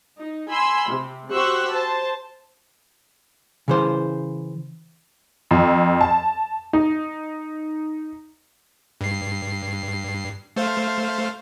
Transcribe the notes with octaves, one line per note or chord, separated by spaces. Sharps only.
D#4
G#5 B5 C6 E6
C3
F#4 G4 C5 C#6 E6 F#6
C5 A5
C#3 E3 C5
F2
A5
D#4
G2 C7
A3 C5 F5